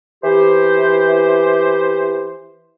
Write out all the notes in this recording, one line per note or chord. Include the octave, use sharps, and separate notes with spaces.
E3 G4 C5